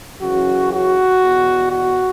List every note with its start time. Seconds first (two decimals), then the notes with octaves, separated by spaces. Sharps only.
0.21 F#2 C#3 E3 F#4
0.72 F#4
1.21 E2 B2
1.71 F#4